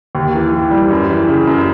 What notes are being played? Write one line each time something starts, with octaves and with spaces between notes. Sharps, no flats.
D#2
E3
E3
G3
F#2
E3
C#3
F#2